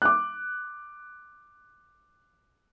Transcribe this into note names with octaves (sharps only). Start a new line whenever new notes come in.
D6 F#6